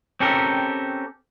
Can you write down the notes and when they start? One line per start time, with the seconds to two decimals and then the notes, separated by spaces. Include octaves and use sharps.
0.20 C4 C#4 G4 A4 A#4